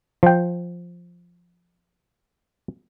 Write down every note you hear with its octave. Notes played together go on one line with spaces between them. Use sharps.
F3 G5